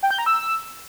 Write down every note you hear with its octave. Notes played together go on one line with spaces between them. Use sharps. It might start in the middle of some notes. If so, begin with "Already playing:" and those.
G5
G6
A#5
E6